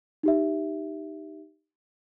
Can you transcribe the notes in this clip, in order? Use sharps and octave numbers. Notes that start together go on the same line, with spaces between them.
D#4 G4 E5